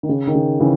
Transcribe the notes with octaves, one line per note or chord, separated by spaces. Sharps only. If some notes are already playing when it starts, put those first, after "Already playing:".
D#3
C#3
D#3
C#3
C#3 E3